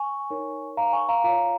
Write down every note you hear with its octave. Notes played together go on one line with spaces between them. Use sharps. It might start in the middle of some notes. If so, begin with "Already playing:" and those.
Already playing: G#5 C#6
D#4 A#4 C#5
F5 A#5
G#5 C#6
F5 A#5
F4 C#5 F5 A#5